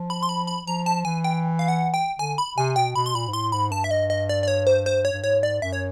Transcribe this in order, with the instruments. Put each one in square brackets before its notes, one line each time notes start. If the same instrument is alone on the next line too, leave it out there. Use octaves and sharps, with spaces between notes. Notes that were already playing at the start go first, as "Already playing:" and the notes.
Already playing: [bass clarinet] F3
[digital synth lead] B5
C6
B5
B5
[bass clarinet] F3 [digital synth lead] A#5
[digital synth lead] A5
[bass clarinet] E3 [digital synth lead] G#5
[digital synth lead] G5
F5
F#5
G5
[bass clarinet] D3 [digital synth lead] G#5
[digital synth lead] B5
[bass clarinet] C3 [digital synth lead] G#5
[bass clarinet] B2 [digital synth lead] G5
[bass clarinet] B2 [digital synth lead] B5
[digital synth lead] C6
[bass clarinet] A#2 [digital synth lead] B5
[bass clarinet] G#2
[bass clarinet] A2 [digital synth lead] C6
[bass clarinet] G#2 [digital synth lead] B5
[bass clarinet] G2 [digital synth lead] A5
[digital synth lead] E5
D#5
D#5
D5
D5
C#5
C5
C5
C#5
[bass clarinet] G2
[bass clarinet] G#2 [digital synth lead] C#5
[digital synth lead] D5
[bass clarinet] F#2 [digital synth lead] E5
[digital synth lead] C#5